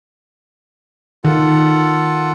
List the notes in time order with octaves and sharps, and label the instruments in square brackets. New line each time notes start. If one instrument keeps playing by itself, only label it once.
[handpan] D#3 [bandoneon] F4 A4 F#5